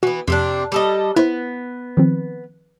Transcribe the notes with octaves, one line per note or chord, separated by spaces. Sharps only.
E3 B3 F#4
F2 C3 C4 D4
G3 A4 D#5
B3 E4 C5
D#3 F3 C4